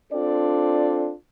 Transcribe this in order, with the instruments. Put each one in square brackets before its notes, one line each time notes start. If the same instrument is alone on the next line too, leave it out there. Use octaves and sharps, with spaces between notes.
[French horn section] C4 D4 F4 A4 D5